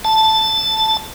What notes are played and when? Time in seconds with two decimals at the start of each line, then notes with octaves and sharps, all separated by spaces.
0.05 A5